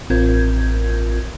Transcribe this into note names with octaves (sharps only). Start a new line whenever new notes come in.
A1 C4 F4 A#4 G6 G#6